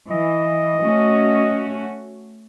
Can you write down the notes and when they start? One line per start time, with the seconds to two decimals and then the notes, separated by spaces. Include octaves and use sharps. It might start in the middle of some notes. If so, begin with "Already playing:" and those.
0.11 E3 D#5
0.82 A3 C#4 F#4